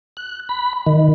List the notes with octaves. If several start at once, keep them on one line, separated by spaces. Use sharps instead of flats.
F#6
B5
D#3